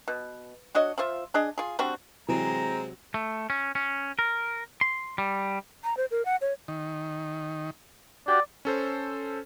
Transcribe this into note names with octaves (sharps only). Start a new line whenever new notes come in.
B2
D4 F#4 C#5 D#5
F3 F4 C5 E5
D4 G#4 D#5
F4 G#4
G3 C4 D4 F#4
C3 E3 F#3 G#3 C4 A#5
A3
C#4
C#4
A#4
C6
G3
A#5
C5
A#4
F#5
C#5
D#3
F#4 G4 D5
C#4 A4 C5